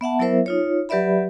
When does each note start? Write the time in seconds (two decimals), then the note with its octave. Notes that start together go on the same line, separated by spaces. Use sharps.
0.01 B3 E5 F#5 A5
0.19 F#3 B3 E4 A#4 C5 E5
0.46 D#4 F4 C#5
0.89 F#3 G4 B4 D5 E5 B5